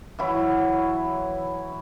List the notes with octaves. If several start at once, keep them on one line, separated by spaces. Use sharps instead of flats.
E3 F#3 E4